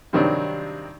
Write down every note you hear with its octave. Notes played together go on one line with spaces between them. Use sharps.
G2 C3 D#3 F#3 C4 D4